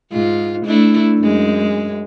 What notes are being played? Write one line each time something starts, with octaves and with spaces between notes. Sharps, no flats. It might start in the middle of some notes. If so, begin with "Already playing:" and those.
G#2 F4
A3 D4 E4
F#2 G#3